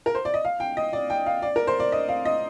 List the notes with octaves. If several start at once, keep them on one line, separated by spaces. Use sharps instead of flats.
A#4
C5
D5
D#5
F5
G5
D#5
D5
G5
F5
D5
A#4
C5
D5
D#5
F5
D#5